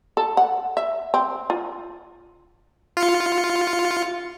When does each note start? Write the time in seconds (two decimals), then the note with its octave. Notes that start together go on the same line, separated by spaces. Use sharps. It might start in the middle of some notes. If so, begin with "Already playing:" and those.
0.17 A4
0.37 F#5
0.77 E5
1.14 C4
1.50 F4
2.97 F4 C#7